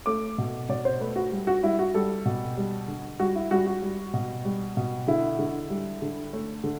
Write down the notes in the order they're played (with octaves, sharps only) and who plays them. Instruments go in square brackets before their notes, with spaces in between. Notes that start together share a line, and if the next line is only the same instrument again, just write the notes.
[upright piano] A3 D6
B2
B2 D5
C5
A3 B4
F#4
G3
F#4
G3 E4
F#4
G3 A4
B2
G3
D3
G3 F#4
E4
G3 F#4
F#4
G3
B2
G3
B2
D3 E4
D3
G3
D3
A3
D3